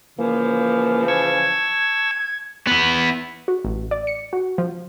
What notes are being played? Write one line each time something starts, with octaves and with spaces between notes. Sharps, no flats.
C#3 E3 F3 A#3
A5 C#6 E6 G#6
B3 E4
F#4
A1
D5
C#7
F#4
F3